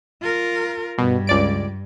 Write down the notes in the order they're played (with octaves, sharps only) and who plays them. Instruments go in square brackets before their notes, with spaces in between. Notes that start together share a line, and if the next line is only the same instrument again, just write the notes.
[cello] F4 A#4
[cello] G2 [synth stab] B2
[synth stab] C#2 D5 D7